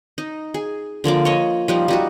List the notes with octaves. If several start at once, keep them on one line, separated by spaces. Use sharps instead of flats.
D#4
G#4
D3 F3 A#3 D5
C#5 D#5
F3 G3 D#4
G3 D#4 F#4